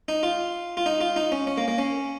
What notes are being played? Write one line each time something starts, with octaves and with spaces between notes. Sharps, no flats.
D#4
F4
F4
D#4
F4
D#4
C#4
C#4
A#3
A#3
C#4